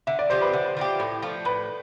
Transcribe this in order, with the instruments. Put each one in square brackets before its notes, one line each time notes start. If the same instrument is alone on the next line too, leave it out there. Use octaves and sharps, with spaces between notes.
[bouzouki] D3 [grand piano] E5
[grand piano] D5
[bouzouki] F3 C4 G4 [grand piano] C5
[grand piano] B4
[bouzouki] D3
F3 C4 G4
A2
F3 A3
[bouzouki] A2 [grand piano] B4